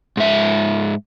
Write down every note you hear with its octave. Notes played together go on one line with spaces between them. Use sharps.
G#2 E5